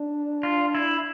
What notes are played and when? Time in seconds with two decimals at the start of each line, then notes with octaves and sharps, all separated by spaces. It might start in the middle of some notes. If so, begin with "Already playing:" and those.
Already playing: D4
0.43 F4
0.75 E4